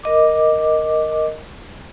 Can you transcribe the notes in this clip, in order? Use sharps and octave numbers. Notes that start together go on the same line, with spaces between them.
A#4 D#5 D6